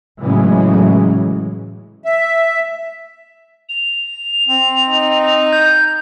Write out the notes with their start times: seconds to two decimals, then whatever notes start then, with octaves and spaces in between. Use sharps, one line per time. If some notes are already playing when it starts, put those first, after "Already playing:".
0.20 A2 C#3 E3 F#3 G#3
2.04 E5
3.69 F7
4.47 C4
4.88 D#4
5.53 G6